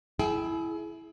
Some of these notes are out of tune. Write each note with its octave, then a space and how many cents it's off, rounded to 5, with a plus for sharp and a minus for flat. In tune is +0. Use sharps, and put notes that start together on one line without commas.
E4 +0 G#4 +35 G5 +0